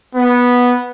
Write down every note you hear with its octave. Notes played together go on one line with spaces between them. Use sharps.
B3